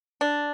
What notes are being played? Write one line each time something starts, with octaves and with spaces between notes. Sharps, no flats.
D4